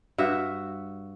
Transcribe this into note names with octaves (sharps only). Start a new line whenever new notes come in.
G2 F#4 E5